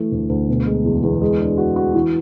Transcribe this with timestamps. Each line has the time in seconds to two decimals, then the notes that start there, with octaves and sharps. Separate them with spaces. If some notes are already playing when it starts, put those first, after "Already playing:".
Already playing: E3 A3
0.12 D2
0.30 D2
0.48 B2
0.66 G#3
0.84 E2
1.03 E2
1.21 G#3
1.40 D4
1.58 F#4
1.76 F#4
1.94 E3